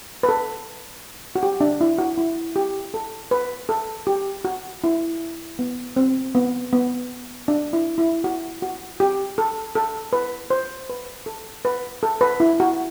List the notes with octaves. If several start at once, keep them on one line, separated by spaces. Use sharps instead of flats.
B4
A4
F#4
G4
D4
E4
F#4
E4
G4
A4
B4
A4
G4
F#4
E4
B3
C4
B3
B3
D4
E4
E4
F#4
F#4
G4
A4
A4
B4
C5
B4
A4
B4
A4
B4
E4
F#4